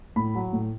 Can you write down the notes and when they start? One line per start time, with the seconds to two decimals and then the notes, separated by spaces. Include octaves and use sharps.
0.16 A2 B5
0.35 F#3
0.53 A2